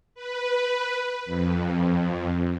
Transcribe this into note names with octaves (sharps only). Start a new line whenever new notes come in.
B4
F2